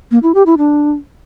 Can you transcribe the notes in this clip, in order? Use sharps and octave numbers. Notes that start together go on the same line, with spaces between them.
A#3
E4
G4
E4
D4